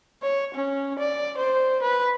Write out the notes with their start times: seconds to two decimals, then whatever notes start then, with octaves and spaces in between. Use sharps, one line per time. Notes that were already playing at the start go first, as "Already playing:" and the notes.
0.22 C#5
0.54 C#4
0.99 D5
1.37 C5
1.82 B4